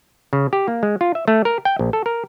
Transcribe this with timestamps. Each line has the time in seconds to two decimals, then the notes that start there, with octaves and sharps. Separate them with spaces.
0.33 C#3
0.53 G4
0.68 A#3
0.83 G#3
1.01 F4
1.15 E5
1.28 A3
1.45 A#4
1.65 G5
1.79 A#1
1.93 A4
2.06 A#4